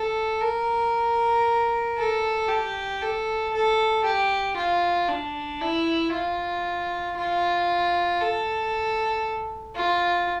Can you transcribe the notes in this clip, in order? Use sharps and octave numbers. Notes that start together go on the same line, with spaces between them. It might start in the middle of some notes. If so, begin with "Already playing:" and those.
Already playing: A4
A#4
A4
G4
A4
A4
G4
F4
D4
E4
F4
F4
A4
F4